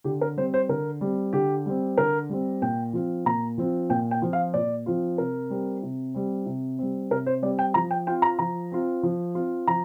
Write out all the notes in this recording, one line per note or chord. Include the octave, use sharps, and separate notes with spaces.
D3 G4
A#4
G3 C4 C5
C5
D3 A#4
G3 C4
D3 G4
G3 C4
D3 A#4
G3 C4
A#2 G5
F3 C4 F4
A#2 A#5
F3 C4 F4
A#2 G5
G5
F3 C4 F4
F5
A#2 D5
F3 C4 F4
C3 A#4
G3 C4
C3
G3 C4
C3
G3 C4
C3 A#4
C5
G3 C4 D5
G5
F3 A#5
G5
C4 F4 G5
A#5
F3 A#5
C4 F4
F3
C4 F4
F3 A#5